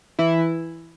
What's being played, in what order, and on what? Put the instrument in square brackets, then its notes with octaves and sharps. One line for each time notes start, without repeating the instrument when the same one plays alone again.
[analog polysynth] E3 E4